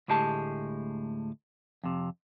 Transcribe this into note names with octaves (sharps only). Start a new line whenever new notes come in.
D2 A2 G#3 G4 A5
F2 C3